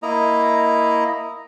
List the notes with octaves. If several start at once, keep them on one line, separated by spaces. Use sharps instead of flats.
A#3 E4 D#5 A#5